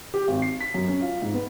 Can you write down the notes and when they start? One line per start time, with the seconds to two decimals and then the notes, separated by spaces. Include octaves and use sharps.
0.14 G4
0.28 G#1
0.42 C7
0.61 B6
0.74 F#2
0.88 C#4
1.01 F4
1.22 G#2
1.34 B3